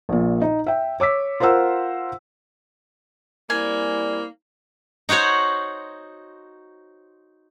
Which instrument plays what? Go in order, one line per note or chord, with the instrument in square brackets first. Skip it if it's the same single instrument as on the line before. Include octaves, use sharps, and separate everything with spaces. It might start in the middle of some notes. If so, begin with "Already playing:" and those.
[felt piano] A#1 A#2
D#4
E5 G5
C#5 D6 E6 B6
F4 A#4 C5 F#5 E6
[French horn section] G3 C4 D5 [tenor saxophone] A#3 [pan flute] E4 [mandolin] G#5
[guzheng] D#4 F#4 C5 C#5 F#5